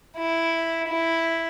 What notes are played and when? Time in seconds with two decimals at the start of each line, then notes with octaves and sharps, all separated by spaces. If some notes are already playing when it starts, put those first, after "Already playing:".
0.18 E4
0.88 E4